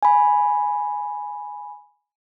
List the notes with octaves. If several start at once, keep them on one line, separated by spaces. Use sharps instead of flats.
G#5 B5